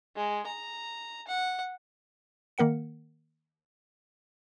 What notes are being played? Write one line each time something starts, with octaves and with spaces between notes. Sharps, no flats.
G#3
A#5
F#5
D#3 A#3 A#4 F#5 C#7